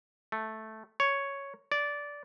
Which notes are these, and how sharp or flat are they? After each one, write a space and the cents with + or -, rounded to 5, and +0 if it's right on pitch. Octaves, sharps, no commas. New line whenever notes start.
A3 -5
C#5 +0
D5 -15